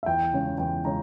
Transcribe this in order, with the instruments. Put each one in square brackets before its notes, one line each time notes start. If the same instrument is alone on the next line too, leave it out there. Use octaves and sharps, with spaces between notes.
[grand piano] E5
[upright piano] E2 [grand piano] G5
[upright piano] C#3 G#3 C#4
[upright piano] E2 [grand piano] G5
[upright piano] C#3 G#3 C#4 [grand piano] A#5